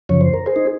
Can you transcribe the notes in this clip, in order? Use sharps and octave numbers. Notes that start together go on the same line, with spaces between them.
F#2 C#3 F3 C#5
C5
A#4
G#4 C5
D#4